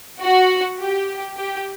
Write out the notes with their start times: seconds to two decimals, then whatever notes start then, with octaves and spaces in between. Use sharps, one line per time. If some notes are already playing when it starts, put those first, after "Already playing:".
0.22 F#4
0.80 G4
1.37 G4